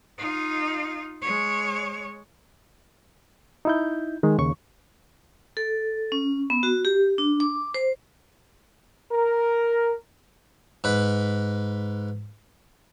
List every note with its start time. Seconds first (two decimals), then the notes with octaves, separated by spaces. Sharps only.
0.18 D#4 F4
1.22 G#3 C#5
3.65 D#4 E4 G6
4.23 D#3 G#3
4.38 D#2 C#3 C#6
5.57 A4
6.12 C#4
6.50 B3
6.63 F#4
6.85 G4
7.18 D4
7.40 D6
7.74 C5
9.12 A#4
10.84 G#2 B4